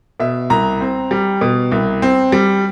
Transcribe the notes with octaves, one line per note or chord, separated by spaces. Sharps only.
B2 E5
C2 A#5
C4
G3
B2
C2
C4
G3